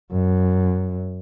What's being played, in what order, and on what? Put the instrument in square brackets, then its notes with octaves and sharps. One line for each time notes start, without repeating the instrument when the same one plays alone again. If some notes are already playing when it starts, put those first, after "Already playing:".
[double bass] F#2